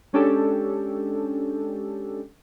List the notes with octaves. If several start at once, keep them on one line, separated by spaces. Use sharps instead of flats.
G#3 C#4 D4 G4 A4